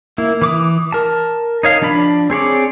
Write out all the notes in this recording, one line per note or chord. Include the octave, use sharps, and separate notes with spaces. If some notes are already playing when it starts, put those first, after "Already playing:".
A#3 E4
E3 D6 D#6
A#4 A5
D#4 C#5 F5
F3 D4 D5 B5
C4 G#4 C#5 D5